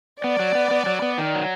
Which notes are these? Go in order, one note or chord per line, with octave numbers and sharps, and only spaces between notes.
B3 D5
F#3
B3
B3
F#3
B3
D#3
F#3